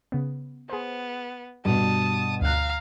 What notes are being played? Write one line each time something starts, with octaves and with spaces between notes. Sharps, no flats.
C#3 B3
B3 G#4 C5
G2 B2 A5 D#6
D2 F5 A#5 F#6